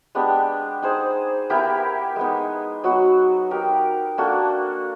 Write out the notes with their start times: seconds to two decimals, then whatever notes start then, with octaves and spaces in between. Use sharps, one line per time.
0.15 G#3 B3 D4 G4
0.82 D#4 G#4 C5
1.50 B3 E4 G4 A#4
2.16 G#3 B3 D#4
2.84 F#3 B3 D#4 F#4
3.51 D#4 G4 A#4
4.18 A#3 D4 F#4 A4